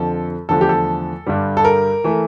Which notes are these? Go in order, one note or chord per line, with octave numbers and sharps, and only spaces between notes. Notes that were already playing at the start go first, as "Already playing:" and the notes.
Already playing: F2 D3 F3 A4
E2 D3 F3 A3 A4
G4
A4
G2 D3 G3
A4
A#4
E3 A3